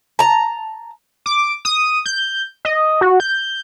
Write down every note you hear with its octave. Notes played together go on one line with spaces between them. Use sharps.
A5 A#5
D6
D#6
G6
D#5
F#4
G6